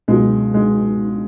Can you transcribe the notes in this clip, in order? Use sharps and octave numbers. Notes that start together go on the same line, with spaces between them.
C#2 B2 F#3 G#3
G#3